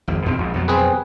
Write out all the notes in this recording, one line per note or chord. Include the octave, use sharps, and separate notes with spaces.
G#1 F2
E2 B2 C4
A#1 G#2
F2 B2 F#3
C4 G#4 B4